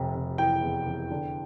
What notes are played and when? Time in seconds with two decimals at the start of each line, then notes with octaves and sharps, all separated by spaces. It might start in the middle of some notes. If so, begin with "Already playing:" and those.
Already playing: F1 C3
0.15 C3
0.38 E3 G5
0.62 E2
0.86 E2
1.11 D3